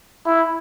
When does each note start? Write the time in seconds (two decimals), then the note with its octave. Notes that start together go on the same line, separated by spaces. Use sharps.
0.26 E4